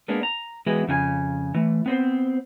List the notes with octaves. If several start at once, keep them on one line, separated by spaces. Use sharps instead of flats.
G#3 A#3 B3 D4
A#5
E3 G#3 B3 E4 F#4
F2 C#3 F4 G#5
E3 A3
B3 C4 C5